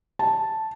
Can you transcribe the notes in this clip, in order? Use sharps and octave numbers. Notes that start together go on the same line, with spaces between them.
A5